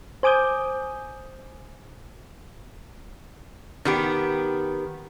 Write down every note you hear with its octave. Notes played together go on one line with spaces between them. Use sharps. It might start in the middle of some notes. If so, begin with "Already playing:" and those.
C5 G#5 D6 D#6 G6
D#3 B3 G4